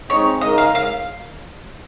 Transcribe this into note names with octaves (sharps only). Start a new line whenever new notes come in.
G#3 C4 D#4 C#5
C#3 G#3 D#4 A#4 D#5
F5
F5